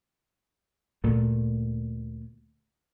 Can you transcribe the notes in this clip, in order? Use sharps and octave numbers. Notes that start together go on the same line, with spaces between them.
D2 A#2 A3